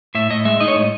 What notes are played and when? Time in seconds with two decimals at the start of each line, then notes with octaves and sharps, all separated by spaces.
0.15 A2 E5
0.31 A2 D#5
0.45 G#3 E5
0.60 D#4 D#5
0.68 C#5
0.76 A2 D#5